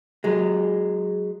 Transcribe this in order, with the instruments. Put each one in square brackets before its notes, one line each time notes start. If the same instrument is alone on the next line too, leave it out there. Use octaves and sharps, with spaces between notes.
[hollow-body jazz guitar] F#3 G#3